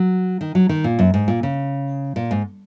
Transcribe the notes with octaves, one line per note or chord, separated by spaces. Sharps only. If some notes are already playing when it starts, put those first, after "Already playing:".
Already playing: F#3
D#3
F#3
D#3
A#2
F#2
G#2
A#2
C#3
A#2
G#2